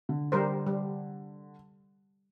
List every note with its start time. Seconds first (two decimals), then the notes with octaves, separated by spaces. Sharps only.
0.09 D3
0.32 G3 A#4 C5
0.67 G3